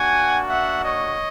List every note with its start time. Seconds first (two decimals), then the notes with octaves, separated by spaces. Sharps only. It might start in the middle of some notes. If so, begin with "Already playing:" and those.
Already playing: A#3 D4 F#4 F#5 G#5
0.48 E5 F#5
0.83 C#5 D#5